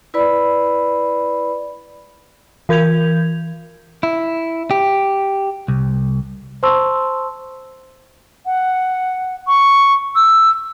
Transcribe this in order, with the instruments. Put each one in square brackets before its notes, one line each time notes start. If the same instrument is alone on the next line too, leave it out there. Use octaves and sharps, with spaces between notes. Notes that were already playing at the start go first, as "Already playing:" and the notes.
[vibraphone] E4 B4 D5 B5
[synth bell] E3 A#4 G6 G#6 F7
[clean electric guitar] E4
G4
C2
[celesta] C5 A5 C6 C#6 E6
[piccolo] F#5
C#6
E6